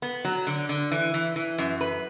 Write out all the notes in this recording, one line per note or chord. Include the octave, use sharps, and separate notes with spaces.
B3
F#3
D3
D3
E3
E3
E3
F#2
B4